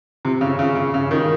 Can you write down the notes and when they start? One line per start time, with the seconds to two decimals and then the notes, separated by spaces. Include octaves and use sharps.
0.25 C3
0.41 C#3
0.59 C#3
0.76 C#3
0.94 C#3
1.11 D#3